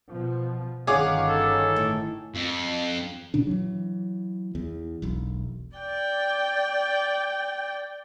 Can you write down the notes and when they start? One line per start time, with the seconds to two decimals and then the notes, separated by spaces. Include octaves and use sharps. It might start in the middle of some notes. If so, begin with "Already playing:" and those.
0.11 B2 F3
0.87 G1 D#3 C#4 F4 G#4 C#5 F#5 D6
1.28 A4
1.76 A2
2.35 F2
3.34 A#2 C#3 D4
3.47 E3 F#3
4.55 E2
5.02 E1 B1
5.76 D5 G5